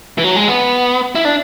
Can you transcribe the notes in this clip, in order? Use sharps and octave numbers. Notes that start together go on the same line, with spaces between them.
E3
F#3
G#3
B3
E4
D4